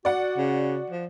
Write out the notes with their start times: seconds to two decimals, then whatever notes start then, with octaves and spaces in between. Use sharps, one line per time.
0.05 F#4 D5 F#5
0.37 C#3
0.90 F3